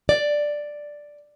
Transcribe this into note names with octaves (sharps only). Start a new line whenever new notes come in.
D5